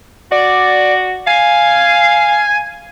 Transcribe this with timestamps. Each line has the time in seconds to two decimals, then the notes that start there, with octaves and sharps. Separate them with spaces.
0.32 F#4 D5
1.27 F5 G#5